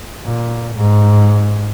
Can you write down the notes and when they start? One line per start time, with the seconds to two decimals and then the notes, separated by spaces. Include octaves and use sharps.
0.25 A#2
0.76 G#2